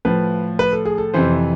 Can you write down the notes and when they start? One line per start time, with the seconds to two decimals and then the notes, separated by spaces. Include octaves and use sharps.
0.05 A2 F3 B4
0.59 B4
0.72 A4
0.85 G#4
0.98 A4
1.14 F2 C3 E3 C5